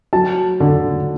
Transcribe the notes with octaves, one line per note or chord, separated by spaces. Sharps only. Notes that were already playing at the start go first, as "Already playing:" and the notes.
F#3 A5
D3